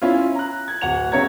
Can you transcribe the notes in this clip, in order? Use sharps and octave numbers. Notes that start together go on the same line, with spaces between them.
C#4 E4 F4
A#5 F#6
G#6
D1 F#5 F7
C#3 C#5 E5 A#5 G#6